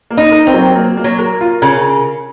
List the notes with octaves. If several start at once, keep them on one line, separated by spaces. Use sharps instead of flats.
A#3
D#4
A#4
C4
F#3
A#3
A#3
F#3
A#4
F4
C#3 A#4